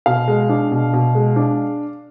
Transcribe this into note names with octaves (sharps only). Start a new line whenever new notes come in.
B2 F5
G#3
D4
B2
B2
G#3
D4